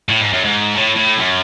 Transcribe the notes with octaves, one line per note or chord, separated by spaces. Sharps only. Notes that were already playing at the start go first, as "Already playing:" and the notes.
A2
G#2
F#2
G#2
A2
A2
F#2